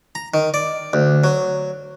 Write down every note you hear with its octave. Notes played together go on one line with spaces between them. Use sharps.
A#5
D#3
D5
D2
F#3